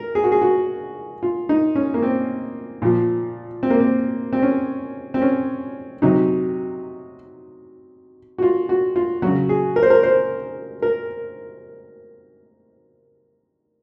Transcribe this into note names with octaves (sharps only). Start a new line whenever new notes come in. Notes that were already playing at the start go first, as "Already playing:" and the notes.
Already playing: A#4
G#4
F#4
G#4
F#4
F4
D#4
C#4
A#3
C4
A#2 F3
C4
A#3
C4
C4
C#4
C4
C#4
C3 F#3 D#4
F#4
F4
F#4
F4
C#3 F#3 F#4
G#4
A#4
C5
A#4
C5
A#4